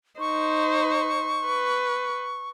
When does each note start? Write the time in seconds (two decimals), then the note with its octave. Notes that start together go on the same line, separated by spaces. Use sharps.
0.20 D#4 C5 C#6
1.47 B4